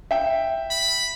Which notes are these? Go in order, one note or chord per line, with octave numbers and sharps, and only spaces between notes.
E5 G5
B5